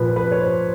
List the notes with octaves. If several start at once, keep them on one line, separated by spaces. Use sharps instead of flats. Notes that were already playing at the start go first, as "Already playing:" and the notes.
Already playing: A#2 F3 B4
B4
C#5
C5